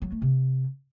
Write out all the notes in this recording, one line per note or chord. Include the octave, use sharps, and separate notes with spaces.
F#3
A3
C3